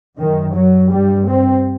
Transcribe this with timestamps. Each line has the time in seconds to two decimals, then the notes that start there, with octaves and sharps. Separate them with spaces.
0.19 F#2 D#3
0.55 F#3
0.92 G2 G3
1.27 C4